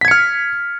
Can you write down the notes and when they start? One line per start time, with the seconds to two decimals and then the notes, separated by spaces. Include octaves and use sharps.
0.01 B6
0.05 G#6
0.08 C#7
0.11 F6